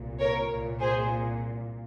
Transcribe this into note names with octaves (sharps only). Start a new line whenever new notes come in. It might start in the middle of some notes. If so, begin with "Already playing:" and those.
Already playing: C2 A#2
A#4 C#5
C2 A#2
G#4 C5